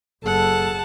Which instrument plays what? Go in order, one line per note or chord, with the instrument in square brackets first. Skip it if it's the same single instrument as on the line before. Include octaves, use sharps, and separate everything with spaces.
[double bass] F#1 [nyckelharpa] G#4 F#5 [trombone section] A4 [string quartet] A5